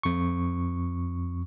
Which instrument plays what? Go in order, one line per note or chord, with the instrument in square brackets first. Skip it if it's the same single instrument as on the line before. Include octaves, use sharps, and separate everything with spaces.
[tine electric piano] F2 C#6